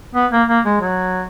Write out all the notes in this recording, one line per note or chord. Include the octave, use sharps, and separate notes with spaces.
B3
A#3
A#3
G#3
F#3